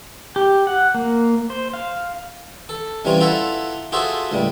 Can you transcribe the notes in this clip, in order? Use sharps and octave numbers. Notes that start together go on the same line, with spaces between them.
G4
F#5
A#3
C5
F5
A4
C3 E3 G3 C#4 F4
E4 F4 A4 E5 F#5 A#5
F4 F#4 G#4 A4 C5 E5
C#2 A2 G3